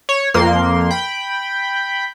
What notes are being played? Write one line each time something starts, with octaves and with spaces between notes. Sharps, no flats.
C#5
F2 A#3 C6
G5 B5